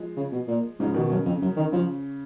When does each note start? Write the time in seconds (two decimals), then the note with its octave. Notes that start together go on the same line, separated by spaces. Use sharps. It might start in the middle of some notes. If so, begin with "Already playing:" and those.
Already playing: F3 G#3
0.17 C#3
0.32 B2
0.48 A#2
0.80 G#2 C#3 F3
0.94 B2 D#3
1.10 F#2 C#3
1.25 F2
1.42 F#2
1.57 D#3
1.72 C#3 F3